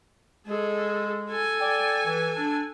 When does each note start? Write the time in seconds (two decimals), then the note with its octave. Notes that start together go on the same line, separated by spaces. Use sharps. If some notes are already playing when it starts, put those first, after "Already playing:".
0.47 G#3 G#4 A4
1.29 A4 G#5
1.59 D5 G5
2.06 E3
2.35 D4